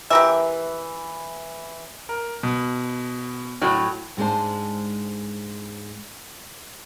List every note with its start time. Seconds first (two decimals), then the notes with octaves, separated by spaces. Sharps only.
0.10 E3 G4 A#4 E5
2.09 A#4
2.43 B2
3.62 A2 F#3 G5
4.17 G#2 G#3 D4 C5 A5